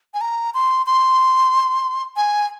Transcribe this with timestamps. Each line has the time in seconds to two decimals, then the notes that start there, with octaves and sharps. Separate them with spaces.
0.14 G#5
0.21 A#5
0.54 C6
0.86 C6
2.16 G#5